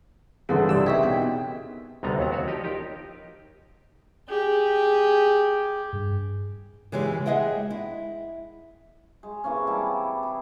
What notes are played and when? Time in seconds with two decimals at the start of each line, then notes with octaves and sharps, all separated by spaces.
0.49 G1 C#3 E3 C4 G#4 A4 F#5 D6
0.69 C2 G4 D5 E6
0.86 D#4 A#4 E5 G5 C#6 G#6 B6
1.03 B2 G5
2.03 D2 C3 G3 B3 D#4 A#5
2.18 D#2 F#3 B3 A#5
2.31 E4 F#4 C#5
2.47 F3 D#4 G4 D5 D#5
2.64 D#4 G4 A#4
4.28 G4 G#4
5.93 G2
6.92 C#3 E3 G#3 C#4 G4
7.26 G#3 G#4 D#5 E5 F#5 G5
7.71 E4
9.23 G#3
9.44 C3 E3 A#3 C#4
9.67 G3 E4 D5 A5
10.23 G#4